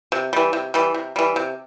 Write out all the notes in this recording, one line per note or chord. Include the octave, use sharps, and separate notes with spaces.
C3
E3 G3
C3
E3 G3
C3
E3 G3
C3